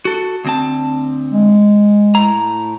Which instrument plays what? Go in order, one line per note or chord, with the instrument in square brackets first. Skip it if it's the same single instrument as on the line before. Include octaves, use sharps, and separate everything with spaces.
[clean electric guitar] F#4 A4
D2 C4 A5
[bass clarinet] G#3
[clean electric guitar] A2 A#5